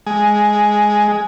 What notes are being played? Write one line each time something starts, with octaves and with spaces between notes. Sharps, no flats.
G#3